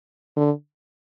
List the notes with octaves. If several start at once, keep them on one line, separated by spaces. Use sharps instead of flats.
D3